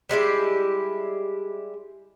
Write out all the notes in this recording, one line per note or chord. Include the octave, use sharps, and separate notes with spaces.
G3 G#3 E4 G4